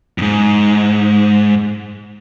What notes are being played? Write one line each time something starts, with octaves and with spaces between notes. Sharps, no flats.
F2 G#2